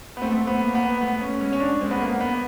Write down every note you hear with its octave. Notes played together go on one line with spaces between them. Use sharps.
B3
A3 C4
B3
A#3
B3
A3 B3
C#4
G#3 C#4
C#4
D4
G#3 C4
B3
A#3
B3